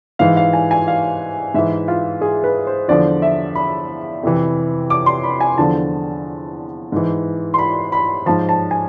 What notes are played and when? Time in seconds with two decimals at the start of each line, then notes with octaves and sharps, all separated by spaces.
0.19 G#2 E3 F5
0.37 F5
0.53 G#5
0.71 G#5
0.88 F5
1.54 G#2 E3 E5
1.88 F4
2.21 G#4
2.44 B4
2.67 C5
2.88 E2 D3 F3 D5
3.22 E5
3.55 B5
4.23 F2 C3 E3
4.90 D6
5.06 C6
5.24 B5
5.41 G#5
5.57 E2 D3 F3 A5
6.92 G#2 E3
7.54 C6
7.58 B5
7.92 B5
8.26 G#2 F3 A5
8.49 A5
8.71 G#5